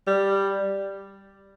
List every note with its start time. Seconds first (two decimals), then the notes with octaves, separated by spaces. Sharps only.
0.07 G3